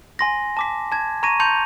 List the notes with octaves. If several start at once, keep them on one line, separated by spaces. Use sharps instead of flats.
G#5 C6 A#6
A5 D6 B6
A5 G#6
A#5 C#6 G#6 A#6 D#7
A5 A#5 C6 G6 C#7 F7